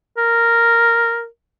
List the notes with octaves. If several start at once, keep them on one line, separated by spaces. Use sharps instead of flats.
A#4